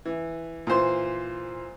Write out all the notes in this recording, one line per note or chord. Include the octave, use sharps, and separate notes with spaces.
E3
A#2 E3 C5 C6